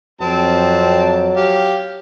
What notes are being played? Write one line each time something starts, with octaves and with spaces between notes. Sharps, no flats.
F2 F#3 C4 A5
G4 F5